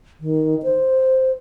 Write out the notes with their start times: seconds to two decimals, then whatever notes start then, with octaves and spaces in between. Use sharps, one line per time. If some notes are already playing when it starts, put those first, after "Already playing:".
0.20 D#3
0.63 C5